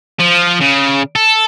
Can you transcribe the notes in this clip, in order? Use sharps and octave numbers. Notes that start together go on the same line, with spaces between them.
F3
C#3
A4